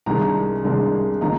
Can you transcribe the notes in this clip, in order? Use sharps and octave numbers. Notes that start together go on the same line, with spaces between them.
C2 C3 D#3 G#3 D4 A#5
C2 C3 D#3 G#3 D4
D3 F3 A#3 D#4 A#5